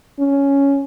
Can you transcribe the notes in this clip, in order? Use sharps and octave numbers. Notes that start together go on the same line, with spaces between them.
C#4